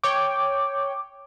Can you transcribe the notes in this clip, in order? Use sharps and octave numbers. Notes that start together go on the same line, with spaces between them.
C#5 G5 D6